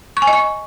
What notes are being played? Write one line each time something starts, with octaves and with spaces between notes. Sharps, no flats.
C#6
G#5
D#5
C#6